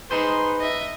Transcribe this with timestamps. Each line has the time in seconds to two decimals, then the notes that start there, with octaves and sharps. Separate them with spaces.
0.11 D#4 G#4 B4 C5 C6
0.60 D#5 E5